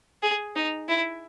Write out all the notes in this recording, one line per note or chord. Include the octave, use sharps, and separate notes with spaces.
G#4
D#4
E4